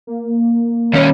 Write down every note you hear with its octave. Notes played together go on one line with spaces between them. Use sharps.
A#3
D#2 C#4